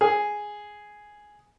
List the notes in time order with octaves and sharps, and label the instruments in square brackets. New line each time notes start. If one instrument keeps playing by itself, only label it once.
[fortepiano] G#4